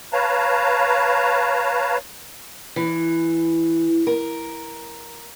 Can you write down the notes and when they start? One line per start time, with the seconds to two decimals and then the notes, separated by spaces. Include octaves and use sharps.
0.13 B4 C#5 F5 A5 A#5
2.76 E3
4.07 A#4